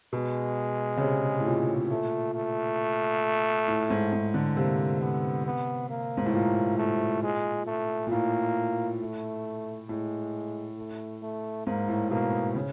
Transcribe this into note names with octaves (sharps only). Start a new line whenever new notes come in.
B2 G#3
C#3
C3
A2
A#2
A3
A3
A2
G#2
G#2
D3
C3 A#3
B3
B3
A#3
G#2
A2
A#2 A#3
A3
G#3
A3
A#2
A2 A#3
A3
A2 G#3
A3
A3
G#2 A#3
A2
B2 A#3
C#3